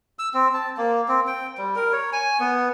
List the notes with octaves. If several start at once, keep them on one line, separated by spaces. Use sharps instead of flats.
E6
C4
A5
A#3
C4
G5
G3
A#4
C#5
G#5
B3